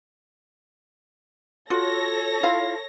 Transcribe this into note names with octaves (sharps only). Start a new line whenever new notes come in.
F4 F#4 A4 C#5 A#6
E4 F4 F5